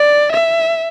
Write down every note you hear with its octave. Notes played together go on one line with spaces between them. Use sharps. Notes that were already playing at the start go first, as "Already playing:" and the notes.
Already playing: D5
E5